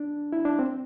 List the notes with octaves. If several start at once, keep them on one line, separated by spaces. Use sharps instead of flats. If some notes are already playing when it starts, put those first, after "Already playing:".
Already playing: D4
E4
D4
C4